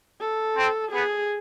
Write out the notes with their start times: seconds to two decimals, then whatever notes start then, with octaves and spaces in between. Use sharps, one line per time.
0.21 A4
0.56 C4
0.92 B3 G#4